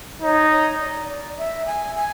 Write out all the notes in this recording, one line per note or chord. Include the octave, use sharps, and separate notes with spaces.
D#4 C#5
C#5
D5
D5
E5
G#5
G#5